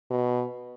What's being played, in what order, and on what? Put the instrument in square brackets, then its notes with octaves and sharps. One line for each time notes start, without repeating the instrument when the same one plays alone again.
[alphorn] B2